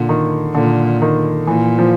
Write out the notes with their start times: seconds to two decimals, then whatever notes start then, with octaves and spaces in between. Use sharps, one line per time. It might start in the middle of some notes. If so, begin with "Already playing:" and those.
Already playing: A#2 D3
0.09 D#3
0.55 A#2 D3
1.02 D#3
1.47 A#2 E3
1.79 F3